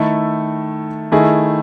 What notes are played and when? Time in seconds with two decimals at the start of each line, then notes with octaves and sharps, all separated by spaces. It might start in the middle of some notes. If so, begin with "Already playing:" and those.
Already playing: D#3 A3 E4 A4
1.12 D#3 A3 E4 G#4